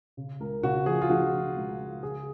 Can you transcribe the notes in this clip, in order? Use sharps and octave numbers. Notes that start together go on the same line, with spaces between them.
C#3
C#2 A#4
C#3 F#4
F3 G#4
F4
F3 F#4
F3
C#2
C#2
C#3 G#4